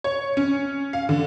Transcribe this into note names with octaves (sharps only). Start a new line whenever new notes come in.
C#5
C#4
F5
D3